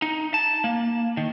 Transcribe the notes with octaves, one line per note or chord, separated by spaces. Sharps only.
D#4
A5
A#3
D#3